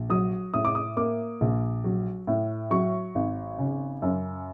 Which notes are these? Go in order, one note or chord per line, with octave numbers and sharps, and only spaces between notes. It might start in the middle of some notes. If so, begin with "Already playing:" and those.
Already playing: A#1
F#3 D#6
A2 D#6
D6
D#6
A#3 D6
A#1
F#3
A2
F#3 C#6
G#1
C#3
F#2